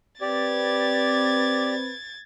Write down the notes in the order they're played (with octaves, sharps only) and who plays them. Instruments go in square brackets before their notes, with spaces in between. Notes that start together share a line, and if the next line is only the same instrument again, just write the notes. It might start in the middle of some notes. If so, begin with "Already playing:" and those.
[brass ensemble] C4 B4 [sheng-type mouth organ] G4 D5 [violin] G#6 A6